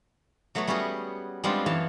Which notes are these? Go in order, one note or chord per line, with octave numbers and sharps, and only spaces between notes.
F#3 A3 B3 B4 C#5
G3 B3 C#4 F#4 G#4
G3 G#3 B3 C4 D4 F4
F#2 E3 C#5 F5 A5